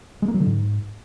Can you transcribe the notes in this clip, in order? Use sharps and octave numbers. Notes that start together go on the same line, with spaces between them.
G#3
A#3
F#3
D3
G#2